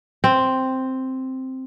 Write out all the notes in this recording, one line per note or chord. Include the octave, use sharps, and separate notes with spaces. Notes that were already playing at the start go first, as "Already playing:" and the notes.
C4